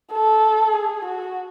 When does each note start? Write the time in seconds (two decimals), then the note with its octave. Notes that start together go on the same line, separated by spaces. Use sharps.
0.12 A4
0.74 G#4
1.05 F#4